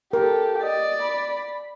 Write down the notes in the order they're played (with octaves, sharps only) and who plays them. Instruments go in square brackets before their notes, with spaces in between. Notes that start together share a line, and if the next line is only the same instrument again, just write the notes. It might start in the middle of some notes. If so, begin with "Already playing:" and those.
[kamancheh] G4 A4 [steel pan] A#4
[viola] D5 [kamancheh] D#5
[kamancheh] B5